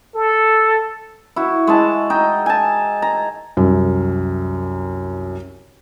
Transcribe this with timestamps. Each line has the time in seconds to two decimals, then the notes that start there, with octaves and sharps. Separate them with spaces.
0.15 A4
1.36 E4 F#4
1.67 G#3 E4 A5
2.10 D#4 G5
2.46 G#5 A5
3.02 A#5
3.57 C2 F#2